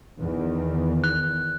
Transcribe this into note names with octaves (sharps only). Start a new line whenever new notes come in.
E2 D#3
F#6